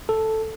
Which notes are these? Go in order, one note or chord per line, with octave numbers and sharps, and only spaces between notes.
A4